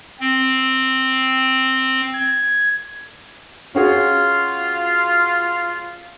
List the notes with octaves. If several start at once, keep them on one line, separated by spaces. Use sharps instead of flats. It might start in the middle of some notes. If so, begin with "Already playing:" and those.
C4
G#6
C#4 F4 F#4 G#4